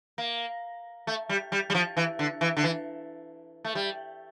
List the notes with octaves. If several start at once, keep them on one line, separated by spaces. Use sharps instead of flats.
A#3
A3
G3
G3
G3
F3
E3
D3
E3
D3
E3
A3
G3